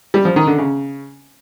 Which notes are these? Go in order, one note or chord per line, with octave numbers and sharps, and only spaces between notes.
G3
F3
D#3
D3
C#3